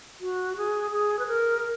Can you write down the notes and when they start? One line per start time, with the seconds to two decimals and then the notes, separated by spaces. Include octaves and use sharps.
0.21 F#4
0.57 G#4
0.91 G#4
1.19 B4
1.27 A#4